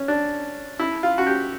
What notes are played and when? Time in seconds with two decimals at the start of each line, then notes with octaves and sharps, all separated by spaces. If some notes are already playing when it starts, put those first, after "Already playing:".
Already playing: C#4
0.08 D4
0.79 E4
1.03 F4
1.18 F#4
1.27 G4